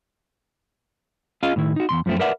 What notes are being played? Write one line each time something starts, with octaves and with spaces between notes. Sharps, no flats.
C#4 F4 G#4 D#5 F5
A2 D#3 E4
D#4 F#4
E2 G#2 C6
F#2 F3 G3 A3 C4
A#4 B4 D5 E5 F#5